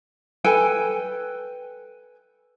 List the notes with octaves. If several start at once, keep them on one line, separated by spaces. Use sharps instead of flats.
A4 B4 G5 G#5